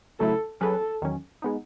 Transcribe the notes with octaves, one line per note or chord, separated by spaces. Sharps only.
C#3 F#3 A3 E4 A4
F#3 C#4 G#4 A4 B4
E2 D#3 F#3 C#4
G#3 B3 D#4